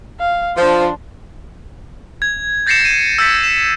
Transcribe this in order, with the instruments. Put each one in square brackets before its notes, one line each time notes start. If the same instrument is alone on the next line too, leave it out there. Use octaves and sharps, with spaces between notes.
[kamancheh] F5
[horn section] F3 [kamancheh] D4 C5
[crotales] G#6
G6 A6 A#6 C7 C#7 E7
D#7
E6 G6 A6 B6 C#7
E7